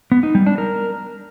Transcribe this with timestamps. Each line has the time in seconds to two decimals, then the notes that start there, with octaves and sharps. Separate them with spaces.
0.12 B3
0.23 D#4
0.35 G3
0.46 D4
0.58 A#4